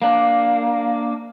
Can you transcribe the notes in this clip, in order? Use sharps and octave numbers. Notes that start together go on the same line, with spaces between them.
A#3 D4